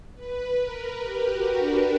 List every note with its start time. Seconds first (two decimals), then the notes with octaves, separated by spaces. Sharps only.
0.15 B4
0.59 A#4
1.02 G4
1.30 F#4
1.58 D4